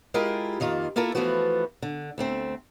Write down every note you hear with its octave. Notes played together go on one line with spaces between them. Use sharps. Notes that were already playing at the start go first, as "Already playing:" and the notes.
G#3 E4 F4 G4 A#4
F2 D#3 A#3 F4
A#3 E4 F4 A4 A#4
E3 F3 A3 B3 F#4 B4
D3
D2 A3 C4